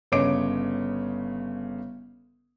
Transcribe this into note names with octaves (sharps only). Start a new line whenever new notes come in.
G1 C#3 C#5 D#5 D6 D7